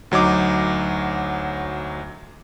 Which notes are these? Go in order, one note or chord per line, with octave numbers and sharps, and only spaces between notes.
D2 F#3 D#4 D6